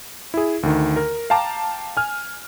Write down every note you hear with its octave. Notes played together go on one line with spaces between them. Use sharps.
E4 G#4
D2 D#3
A#4
F5 G5 A5 A#5 D6
G#5 F6